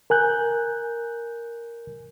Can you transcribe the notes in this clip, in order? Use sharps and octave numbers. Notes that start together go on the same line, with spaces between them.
A#4 G#5 F#6 G6